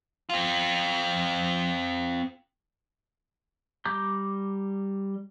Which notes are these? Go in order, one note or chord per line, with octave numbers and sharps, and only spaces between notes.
C4 F4
G3 A#5 D6 G6